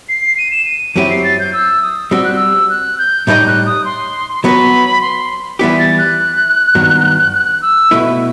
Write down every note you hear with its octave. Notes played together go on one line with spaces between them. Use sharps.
C7
D#7
E7
D#7
F#2 F#3 C4 E4 G4 D#7
C7
A6
G6
E6
D#6
G3 C4 F#4 E6
F#6
E6
F#6
G6
A2 G3 D#4 A4 D#5 G6
F#6
D#6
C6
C6
F#3 B3 F#4 B4 B5
C6
E3 G3 B3 E4 G4 B6
A6
F#6
G2 D#3 F#3 B3 F#4
F#6
E6
B2 A3 E4 B4